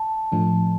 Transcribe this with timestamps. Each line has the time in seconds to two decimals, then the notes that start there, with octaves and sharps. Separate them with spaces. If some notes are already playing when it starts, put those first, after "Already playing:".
Already playing: A5
0.32 A2 F3 A3 D4